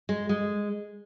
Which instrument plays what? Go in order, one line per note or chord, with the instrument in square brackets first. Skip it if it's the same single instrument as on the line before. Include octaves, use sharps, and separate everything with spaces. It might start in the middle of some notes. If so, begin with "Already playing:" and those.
[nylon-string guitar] G#3
G#3